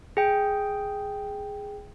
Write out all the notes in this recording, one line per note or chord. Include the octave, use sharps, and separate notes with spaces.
G#4 G5